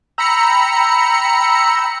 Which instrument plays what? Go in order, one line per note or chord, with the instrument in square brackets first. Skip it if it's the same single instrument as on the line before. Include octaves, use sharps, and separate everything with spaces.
[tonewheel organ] G5 E6 [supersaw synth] A#5 B5 C#7